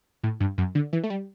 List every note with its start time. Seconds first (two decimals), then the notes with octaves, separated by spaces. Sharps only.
0.23 A2
0.40 G2
0.58 F#2
0.75 D3
0.93 E3
1.04 A3
1.10 G3